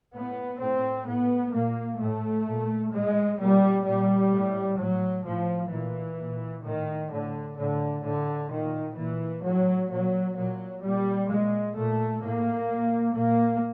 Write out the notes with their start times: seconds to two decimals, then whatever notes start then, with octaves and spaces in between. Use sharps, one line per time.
0.14 A2 B3
0.60 A2 C4
1.07 A2 B3
1.53 A#2 A#3
2.00 A2 A3
2.47 A#2
2.93 A2 G#3
3.39 A#2 G3
3.85 A#2 G3
4.32 A2
4.78 A2 F#3
5.25 A2 F3
5.71 A#2 E3
6.18 A#2
6.64 A2 D#3
7.11 A2 D3
7.57 A2 D3
8.04 A2 D3
8.50 A#2 D#3
8.97 A#2 E3
9.44 A2 F#3
9.89 A#2 F#3
10.36 A#2 F#3
10.82 A#2 G3
11.29 A#2 G#3
11.76 A#2 A3
12.22 A2 A#3
12.69 A#2
13.15 A#2 A#3